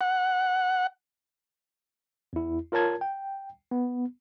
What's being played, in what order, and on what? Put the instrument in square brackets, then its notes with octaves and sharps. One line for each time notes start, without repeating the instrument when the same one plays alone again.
[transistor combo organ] F#5
[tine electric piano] E2 E4
F4 A#4 C#5 A5 G#6
G5
B3